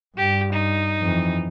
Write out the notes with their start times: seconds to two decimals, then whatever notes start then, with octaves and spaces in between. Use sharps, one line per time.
0.17 G2 G4
0.53 D#4
1.01 F2 E3